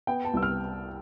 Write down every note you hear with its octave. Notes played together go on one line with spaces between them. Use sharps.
B3 G5
A5
C2 E6
F6